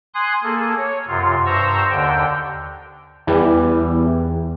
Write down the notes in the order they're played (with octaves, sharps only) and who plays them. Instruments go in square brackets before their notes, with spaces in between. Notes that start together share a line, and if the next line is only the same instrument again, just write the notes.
[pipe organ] G#5 C6 D#6 F#6
A#3 G#4 A4
C#5
F#2 C3 F4
G2 C5 A#5 C#6 E6
D#2 D3 G5
[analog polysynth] E2 [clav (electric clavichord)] E3 G3